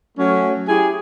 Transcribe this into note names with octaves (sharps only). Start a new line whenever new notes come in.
F#3 A3 C#4
E4 G4 G#4